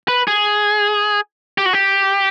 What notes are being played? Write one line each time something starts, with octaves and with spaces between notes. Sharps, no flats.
B4
G#4
G4
F#4
G4